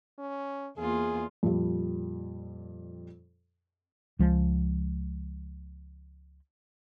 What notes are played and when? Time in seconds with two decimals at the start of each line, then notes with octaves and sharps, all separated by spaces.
0.19 C#4
0.77 E2 A#3 F4 G#4
1.43 F2 A#2 G3
4.19 C#2 F3 G#3